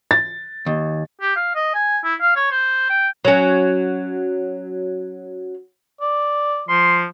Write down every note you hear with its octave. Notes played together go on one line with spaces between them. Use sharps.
A6
D#2
G4
F5
D#5
G#5
E4
F5
C#5
C5
G5
F#3 C#4
D5
F3 C6